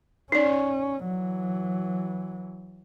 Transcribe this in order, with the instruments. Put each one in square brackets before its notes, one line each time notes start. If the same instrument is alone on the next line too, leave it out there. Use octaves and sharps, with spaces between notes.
[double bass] C#4 [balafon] D#4 D5
[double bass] E3 F#3